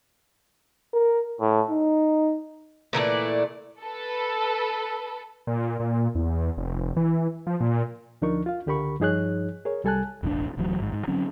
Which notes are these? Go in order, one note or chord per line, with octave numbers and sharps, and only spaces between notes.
A#4
A2
D#4
A#2 E3 A3 D5
A4 B4
A#2
A#2
E2
F1
E3
F3
A#2
D2 F3 D4 D#4 A#4 C#6
F4 F5
C#2 D3 G4 A#4 B5 C#6
G2 F3 D#4 G#4 C#5 F#6
G#4 A#4 C#5
C2 G3 A4 G#5 A5 F#6
E1 A1 C#3 D4
D1 D2 E3 F#3
G#1 G#2
G#2
D3 F#3 C4 C#4